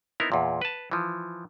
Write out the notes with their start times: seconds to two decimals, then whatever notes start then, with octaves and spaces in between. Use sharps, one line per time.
0.20 B3 C4 D#4 E4 A#4
0.32 E2 A#2
0.62 B4 A5
0.91 E3 F3